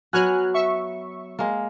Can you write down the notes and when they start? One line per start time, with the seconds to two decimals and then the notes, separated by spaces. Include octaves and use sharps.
0.13 F#3 B3 F#4 G#5 F6 F#6
0.54 E5 C#6
1.39 G#3 A#3